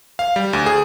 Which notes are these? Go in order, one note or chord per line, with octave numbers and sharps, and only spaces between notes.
F5
G3
D2
G#4